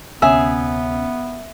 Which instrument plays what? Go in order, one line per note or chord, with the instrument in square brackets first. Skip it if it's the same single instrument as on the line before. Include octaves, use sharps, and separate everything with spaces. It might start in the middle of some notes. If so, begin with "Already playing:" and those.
[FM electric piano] D2 C3 C#4 [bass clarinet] B3 [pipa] G#4 [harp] E5